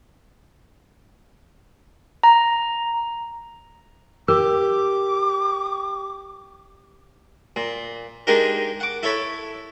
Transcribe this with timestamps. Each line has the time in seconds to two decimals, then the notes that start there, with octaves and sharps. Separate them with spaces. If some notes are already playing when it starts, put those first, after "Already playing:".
2.23 A#5
4.28 G4 A#4 D6
7.56 A#2
8.27 G#3 A#3 D4 D#4 G4 A#4
8.80 F#5 D6
9.03 E4 A4 C#5 B5